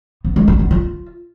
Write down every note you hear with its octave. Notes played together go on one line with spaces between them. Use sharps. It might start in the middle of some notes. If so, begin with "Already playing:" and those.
B3
G#3
D4
B3
F4